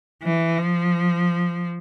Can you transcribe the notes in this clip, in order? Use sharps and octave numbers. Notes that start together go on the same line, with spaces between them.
E3
F3